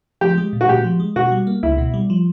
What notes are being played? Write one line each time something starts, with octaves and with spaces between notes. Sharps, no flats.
F3 G4
G#3
A#2
F#4
A#2 G4
F3
G#3
B2 F#4
G3
A#3
C#2 E4
B2
G3
F3